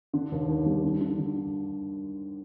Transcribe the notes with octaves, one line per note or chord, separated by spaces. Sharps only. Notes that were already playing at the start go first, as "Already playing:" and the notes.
D3
D#2
D#2
G3
D3
D3
D3